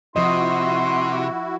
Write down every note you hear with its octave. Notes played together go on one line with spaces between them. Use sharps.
C3 F3 E4 F#4 D#5 C6